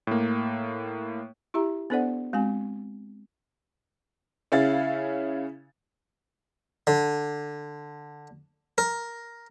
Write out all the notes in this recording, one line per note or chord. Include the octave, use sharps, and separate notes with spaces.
A2 A#3
E4 G4 E5 A#5
B3 D4 A4 C5 D5 F#5
G#3 C4 F#4 G#5
C#3 C#4 E4 F5 A6
D3
A#4